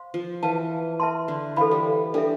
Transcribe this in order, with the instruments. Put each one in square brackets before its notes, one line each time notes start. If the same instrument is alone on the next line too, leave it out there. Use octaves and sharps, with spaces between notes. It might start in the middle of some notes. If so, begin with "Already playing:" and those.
Already playing: [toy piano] C5 F5 C6
[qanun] F3
[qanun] E3 [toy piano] B4 F5 A5
[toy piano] B4 E5 A5 C6
[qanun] D3
[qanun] E3 [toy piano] A4 C5 F5 B5
[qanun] G3
[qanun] G3 [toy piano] D4 A4 E5